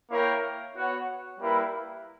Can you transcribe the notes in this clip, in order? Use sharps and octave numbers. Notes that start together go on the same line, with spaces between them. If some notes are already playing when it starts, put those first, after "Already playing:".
A#3 E4 A#4 C#5 G5
B3 F#4 C#5 F#5
G3 A#3 E4 B4